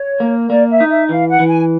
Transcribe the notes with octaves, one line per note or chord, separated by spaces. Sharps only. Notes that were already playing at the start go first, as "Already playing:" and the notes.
Already playing: C#5
A#3
A#3 D5
E5
D#4
E5
E3 F5
F#5
E3
G#5